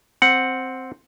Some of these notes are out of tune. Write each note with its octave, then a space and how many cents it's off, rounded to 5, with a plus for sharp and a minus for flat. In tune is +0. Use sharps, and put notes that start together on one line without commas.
C4 +0 F#5 +0